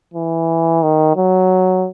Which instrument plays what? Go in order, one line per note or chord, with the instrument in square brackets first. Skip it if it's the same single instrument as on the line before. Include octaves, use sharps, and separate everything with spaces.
[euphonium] E3
D#3
F#3